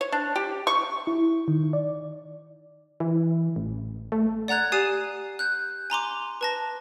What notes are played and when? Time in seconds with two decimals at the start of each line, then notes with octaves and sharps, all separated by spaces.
0.01 C#5
0.12 D4
0.36 G4
0.67 C#6
1.07 E4
1.48 D#3
1.73 D5
3.00 E3
3.56 A1
4.12 A3
4.48 D5 F#5 A#5 F#6 G#6
4.72 G4 D5 G#5 D#6 C7 D#7
5.39 F#6 G6
5.90 G#5 A#5 C6 D6
6.41 B4 A5 A#6